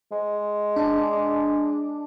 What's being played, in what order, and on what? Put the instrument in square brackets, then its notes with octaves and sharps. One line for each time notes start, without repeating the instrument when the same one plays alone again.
[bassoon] G#3
[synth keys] D4